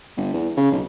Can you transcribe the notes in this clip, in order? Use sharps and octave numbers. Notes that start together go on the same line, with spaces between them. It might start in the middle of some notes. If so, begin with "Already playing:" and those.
G1
E2
C#3
B1